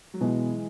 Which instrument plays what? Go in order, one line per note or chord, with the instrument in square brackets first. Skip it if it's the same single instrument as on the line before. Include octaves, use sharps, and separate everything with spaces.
[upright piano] F#3
[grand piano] B2 [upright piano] E3 G#3